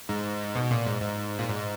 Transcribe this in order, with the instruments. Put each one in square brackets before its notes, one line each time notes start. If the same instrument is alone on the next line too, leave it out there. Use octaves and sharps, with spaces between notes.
[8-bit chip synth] G#2
B2
A#2
G#2
G#2
A#2
G#2